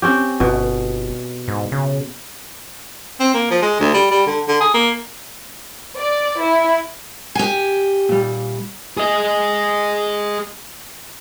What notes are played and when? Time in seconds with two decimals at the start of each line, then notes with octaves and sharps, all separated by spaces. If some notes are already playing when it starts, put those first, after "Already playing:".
0.02 C4 C#4 G4
0.40 G1 B2
1.48 G#2
1.72 C#3
3.20 C4
3.34 A#3
3.50 F3
3.62 G#3
3.80 D2
3.94 G3
4.11 G3
4.27 D3
4.48 D3
4.60 G#4
4.74 A#3
6.00 D5
6.42 E4
7.35 G4 G#5
8.09 A#2 G3
8.97 G#4 D#5